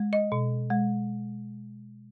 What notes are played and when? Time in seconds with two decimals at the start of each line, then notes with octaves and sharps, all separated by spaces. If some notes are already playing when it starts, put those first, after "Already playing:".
Already playing: G#3
0.13 D#5
0.32 B2
0.70 G#3